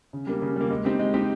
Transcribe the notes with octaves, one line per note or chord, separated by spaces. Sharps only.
C#3
G3 A#3
C#3
G3 A#3
G#3
C4 D#4 G4
G#3
C4 D#4 G4